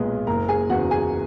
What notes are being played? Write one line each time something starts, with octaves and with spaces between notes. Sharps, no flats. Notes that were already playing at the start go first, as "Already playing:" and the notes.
Already playing: B1 A#2 G#3 B3
F#1 A#4 A#5
G#4 G#5
E2 C#3 F#4 F#5
G#4 G#5